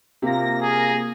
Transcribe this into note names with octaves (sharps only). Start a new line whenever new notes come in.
C3 A#3 F4 A#6
G#4